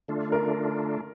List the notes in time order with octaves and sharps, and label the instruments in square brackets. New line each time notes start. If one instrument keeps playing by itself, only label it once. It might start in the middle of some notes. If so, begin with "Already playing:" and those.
[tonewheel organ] D3 A3 D4 F4
[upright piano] A#4